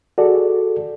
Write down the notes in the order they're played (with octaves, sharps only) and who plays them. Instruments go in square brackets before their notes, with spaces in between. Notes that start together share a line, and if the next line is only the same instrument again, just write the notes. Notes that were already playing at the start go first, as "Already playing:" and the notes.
[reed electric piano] F#4 G#4 A4 D5